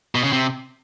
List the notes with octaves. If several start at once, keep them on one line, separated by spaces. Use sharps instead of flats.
B2
C#3
C3